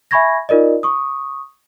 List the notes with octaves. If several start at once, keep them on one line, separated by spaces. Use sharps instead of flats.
E5 G#5 B5 C#6 G#6 A#6
D#4 F4 A#4 D5 D#5
C#6 D#6